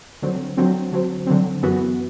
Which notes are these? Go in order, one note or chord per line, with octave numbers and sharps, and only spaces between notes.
D3 F#3 C4
D3 F#3 C4
D3 F#3 C4
D3 F#3 C4
F#2 E3 B3 F#4